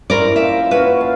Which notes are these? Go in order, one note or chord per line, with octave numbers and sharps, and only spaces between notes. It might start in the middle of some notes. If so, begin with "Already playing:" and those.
C#4 E4 A#4 C5 D5
A#2 E5
C#4 F#4 B4
F5 A5